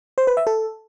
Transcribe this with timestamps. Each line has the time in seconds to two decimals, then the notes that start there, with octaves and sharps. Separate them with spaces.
0.18 C5
0.27 B4
0.37 E5
0.47 A4